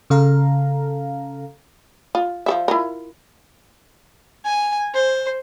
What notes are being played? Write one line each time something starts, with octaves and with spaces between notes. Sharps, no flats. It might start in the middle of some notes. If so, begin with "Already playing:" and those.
C#3 A4 F5 A#5
F4
F3 A4 E5
E4 F4 A#4
G#5
C5